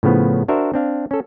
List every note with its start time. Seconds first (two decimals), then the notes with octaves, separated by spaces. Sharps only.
0.03 A2 C#3 F3 B3
0.48 D4 F#4 A#4 C5 E5
0.74 C4 D4 F5
1.11 C#4 A4